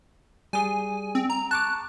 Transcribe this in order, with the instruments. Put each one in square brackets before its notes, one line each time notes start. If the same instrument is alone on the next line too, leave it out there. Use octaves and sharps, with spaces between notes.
[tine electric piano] G3 G#4 [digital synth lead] G#5
[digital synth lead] C4
A#5
[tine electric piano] A5 C#6 D6 [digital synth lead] F#6